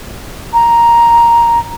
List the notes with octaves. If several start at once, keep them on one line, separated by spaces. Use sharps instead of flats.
A#5